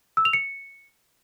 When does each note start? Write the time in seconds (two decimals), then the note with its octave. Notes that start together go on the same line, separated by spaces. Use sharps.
0.17 E6
0.25 F7
0.33 C#7